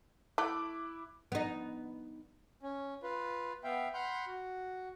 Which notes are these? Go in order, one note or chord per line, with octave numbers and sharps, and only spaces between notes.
A3 E4 D6 F#6
B3 D#4
C#4
F4 B4
B3 E5 F5 G5
F#5 B5 C6 F6 G6
F#4